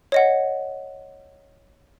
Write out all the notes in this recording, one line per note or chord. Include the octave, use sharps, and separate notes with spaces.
C#5 D#5 F#5